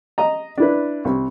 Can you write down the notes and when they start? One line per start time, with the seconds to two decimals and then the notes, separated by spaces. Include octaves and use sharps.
0.18 D#5 A#5
0.58 D4 E4 B4
1.05 C2